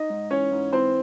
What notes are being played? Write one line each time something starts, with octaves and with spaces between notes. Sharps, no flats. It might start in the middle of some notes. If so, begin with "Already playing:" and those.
Already playing: D#4 D#5
G#2
E3 C#4 C#5
G#2
E3 C4 C5